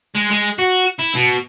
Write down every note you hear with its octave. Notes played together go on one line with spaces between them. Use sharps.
G#3
G#3
F#4
E4
B2